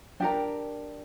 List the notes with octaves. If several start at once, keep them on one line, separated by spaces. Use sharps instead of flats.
D4 G4 A#4 G5